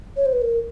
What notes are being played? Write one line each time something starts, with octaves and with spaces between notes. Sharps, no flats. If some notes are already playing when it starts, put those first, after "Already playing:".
C#5
C5
B4
A#4